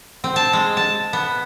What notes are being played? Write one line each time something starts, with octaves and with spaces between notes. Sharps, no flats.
C4
A5
G#3
A5
B3